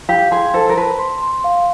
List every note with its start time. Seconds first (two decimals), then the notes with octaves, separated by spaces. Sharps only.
0.09 G4 F5
0.31 G#4 C6
0.54 A4 C5
0.69 A#4
0.77 B4 A5
0.99 C6
1.22 C6
1.44 F5